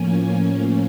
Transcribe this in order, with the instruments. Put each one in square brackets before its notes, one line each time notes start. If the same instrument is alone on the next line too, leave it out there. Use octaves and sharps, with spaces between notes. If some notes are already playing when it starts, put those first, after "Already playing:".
Already playing: [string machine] A2 F3 A#3 C#4 G#5